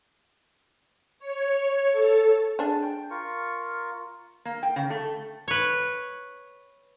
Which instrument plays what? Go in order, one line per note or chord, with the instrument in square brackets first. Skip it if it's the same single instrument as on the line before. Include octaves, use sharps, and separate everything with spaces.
[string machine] C#5
A4
[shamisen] D4 G#4 [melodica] A5
[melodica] G5
F4 A#4 C#6
[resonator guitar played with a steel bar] A#3
G5
C#3
A3
[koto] B4 C#5